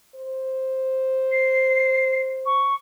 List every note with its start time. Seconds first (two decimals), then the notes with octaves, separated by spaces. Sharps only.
0.15 C5
1.32 C7
2.46 C#6